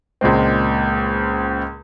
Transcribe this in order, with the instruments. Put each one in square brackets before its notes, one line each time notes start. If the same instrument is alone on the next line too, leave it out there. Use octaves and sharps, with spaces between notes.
[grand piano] C#2 A#2 G#3 C4